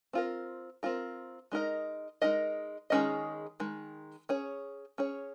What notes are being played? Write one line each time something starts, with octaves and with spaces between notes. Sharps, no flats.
C4 F4 A#4
C4 F4 A#4
G#3 D#4 A#4 D#5
G#3 D#4 A#4 D#5
D#3 G#3 C#4 G#4 D#5
D#3 G#3
C#4 G#4 C#5
C#4 G#4 C#5